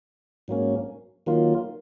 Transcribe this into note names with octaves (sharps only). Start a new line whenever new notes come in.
G#2 F#3 A#3 C#4
D#3 F#3 A#3 F4